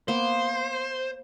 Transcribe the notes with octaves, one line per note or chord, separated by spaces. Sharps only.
A#3 B3 C5